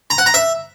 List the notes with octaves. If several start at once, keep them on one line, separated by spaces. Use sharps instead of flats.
A#5
F#5
A#5
E5